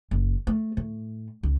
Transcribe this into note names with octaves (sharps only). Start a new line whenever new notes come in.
F#1
A3
A2
C#2